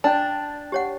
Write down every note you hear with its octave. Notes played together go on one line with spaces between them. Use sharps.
D4 G5 A5
G4 C#5 F#5